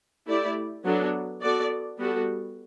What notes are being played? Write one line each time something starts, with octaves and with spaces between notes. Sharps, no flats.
A3 E4 G4 D5
F#3 B3 D4 A4
B3 F#4 A4 D5
G3 B3 F#4 A4